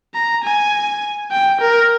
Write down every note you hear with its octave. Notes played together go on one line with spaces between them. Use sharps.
A#5
G#5
G5
A#4